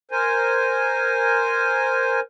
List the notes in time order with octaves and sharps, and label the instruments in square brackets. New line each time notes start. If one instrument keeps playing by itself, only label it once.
[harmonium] A#4 C5 G#5